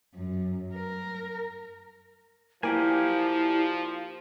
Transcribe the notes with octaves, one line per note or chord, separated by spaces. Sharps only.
F#2
A#4
F3 A#3 E4 G4 D5 G#5